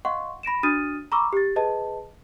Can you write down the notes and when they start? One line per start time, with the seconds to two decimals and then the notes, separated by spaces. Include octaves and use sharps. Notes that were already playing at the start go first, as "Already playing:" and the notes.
0.05 D#5 F5 F#5 C6 C#6
0.43 B5 A#6 D7 E7
0.63 D4 F#4 D#6 F6 A6 D#7
1.12 A#5 B5 C#6 D6 E6
1.33 G4 A6
1.56 G#4 B4 D#5 A5